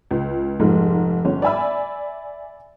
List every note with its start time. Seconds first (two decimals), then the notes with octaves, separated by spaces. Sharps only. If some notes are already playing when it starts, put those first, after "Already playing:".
0.11 C#2
0.60 F1 G#2 G#3
1.25 G1 C#4
1.42 D5 E5 G#5 B5 E6